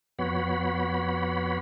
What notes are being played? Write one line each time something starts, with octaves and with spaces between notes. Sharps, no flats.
F2 B3 F#4 C#5 B5